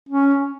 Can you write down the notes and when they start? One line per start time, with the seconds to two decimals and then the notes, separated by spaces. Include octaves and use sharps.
0.09 C#4